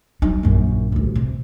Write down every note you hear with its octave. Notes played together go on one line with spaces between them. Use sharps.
F#3 D#4
A#1 F#2
A1 D2
C3